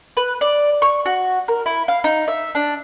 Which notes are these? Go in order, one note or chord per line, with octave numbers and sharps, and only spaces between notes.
B4
D5
C#6
F#4
A#4
E4
F5
D#4
E5
D4